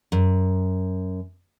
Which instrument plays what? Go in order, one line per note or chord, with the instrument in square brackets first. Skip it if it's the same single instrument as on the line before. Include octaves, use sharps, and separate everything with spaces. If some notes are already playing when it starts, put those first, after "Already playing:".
[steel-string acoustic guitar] F#2